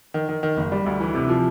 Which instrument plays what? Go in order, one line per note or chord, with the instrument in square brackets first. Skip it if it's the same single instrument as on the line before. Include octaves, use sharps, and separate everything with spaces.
[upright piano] D#3
D#3
D#3
F#1
G3
D2
E3
C3
F3